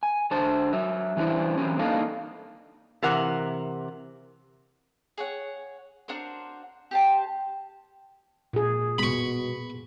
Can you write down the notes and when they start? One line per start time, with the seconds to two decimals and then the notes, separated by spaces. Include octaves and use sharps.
0.03 G#5
0.31 D3 D4 C5 A5
0.73 F#3 E5
1.17 E3 A#3 C#4 D4 E4 C5
1.58 E3 F#3 C4 C#4
1.79 A#3 D4 D#4 A4 D#5 F5
3.03 C3 E3 A#4 F#5
5.18 G#4 C#5 F#5
6.08 D4 F#4 A#4 C5
6.91 G4 C5 A5
8.53 A#2 G#4
8.98 B2 B5 C#6